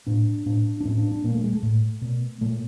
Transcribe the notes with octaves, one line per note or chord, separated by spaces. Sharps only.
A2 D4
A2 D4
D4
A2 C#4
D4
D4
A#2 A#3
A3
G#3
A3
A2
B2
A#2 A3